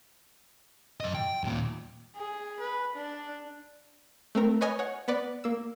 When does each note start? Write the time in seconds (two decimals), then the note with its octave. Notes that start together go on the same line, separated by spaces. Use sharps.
1.00 F#2 D#5
1.14 G5
1.44 D#2 A#2
2.16 G#4
2.60 B4
2.96 D4
4.35 A3 C4 A#4
4.61 B4 C#5 D#5 G#5 D#6 F6
4.79 C#5 F#5
5.08 B3 B4 D5
5.44 A#3 E6